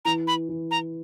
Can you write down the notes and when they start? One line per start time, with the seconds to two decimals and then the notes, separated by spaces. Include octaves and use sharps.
0.05 E3 A#5
0.27 B5
0.49 E3
0.71 A#5